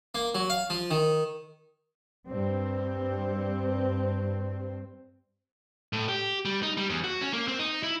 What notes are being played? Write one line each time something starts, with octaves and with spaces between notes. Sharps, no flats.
A#3
F#3
F5
F3
D#3
G2 C4
A2
G4
G3
D#4
G3
E2
F#4
C#4
A#3
C4
D#4
E4